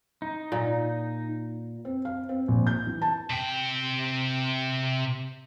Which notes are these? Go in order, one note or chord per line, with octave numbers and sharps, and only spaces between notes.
D#4
A#2
C4
F5
C4
A#1
G6
E3
A5
C3 G5